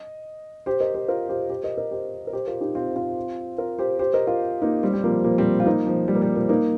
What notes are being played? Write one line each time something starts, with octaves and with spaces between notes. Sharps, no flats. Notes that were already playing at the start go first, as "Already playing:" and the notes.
Already playing: D#5
G4 C5
A#4 D#5
G4 C5
F4 A#4
G4 C5
G4 C5
A#4 D#5
A#4 D#5
G4 C5
A#4
G4 C5
F4 A#4
D#4 G4
C4 F4
C4 F4
F4 A#4
G4 C5
G4 C5
A#4 D#5
F4 A#4
A#3 D#4
G3 C4
G3 C4
F3 A#3
F3 A#3
G3 C4
F4
A#3 D#4
F3
G3
A#3
G3
F3 A#3
A#3 D#4